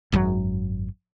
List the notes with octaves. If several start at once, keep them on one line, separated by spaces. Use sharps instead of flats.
G#1 F#2 D3 F#3